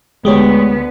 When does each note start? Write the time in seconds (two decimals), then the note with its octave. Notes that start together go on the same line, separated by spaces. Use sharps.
0.25 D2 G#3 B3 G4 C#5